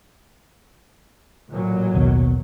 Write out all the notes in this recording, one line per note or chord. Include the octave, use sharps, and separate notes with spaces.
A1 A#2 F#3
A#1 D#2 B2